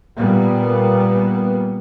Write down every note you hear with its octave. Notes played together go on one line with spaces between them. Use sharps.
A#2 G3 A#3 B3